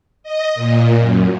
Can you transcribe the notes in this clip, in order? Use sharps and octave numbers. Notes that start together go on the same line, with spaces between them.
D#5
A#2
F#2